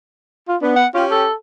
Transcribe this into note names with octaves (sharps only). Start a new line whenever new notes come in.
F4
B3 D4
F#5
C#4 F4 G4
A4